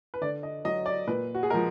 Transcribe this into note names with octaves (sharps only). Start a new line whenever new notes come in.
B4
D3 D5
D#5
F#3 D#5
D5
A#2 B4
F#4
G#4
F3 G#3 A#4